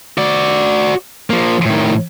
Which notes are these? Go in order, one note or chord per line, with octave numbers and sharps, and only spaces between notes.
F#4 D5
F3 A#3
A2 D#3